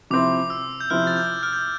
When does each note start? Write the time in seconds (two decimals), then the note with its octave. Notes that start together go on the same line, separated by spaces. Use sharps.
0.11 C3 F3 C4 E4 D6
0.50 E6
0.81 G6
0.90 C3 F3 C4 E4 F6
1.07 A6
1.17 G6
1.43 F6
1.53 G6